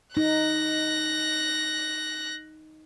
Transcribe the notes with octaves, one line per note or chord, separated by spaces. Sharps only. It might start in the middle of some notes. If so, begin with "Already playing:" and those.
D#4 F#6 A#6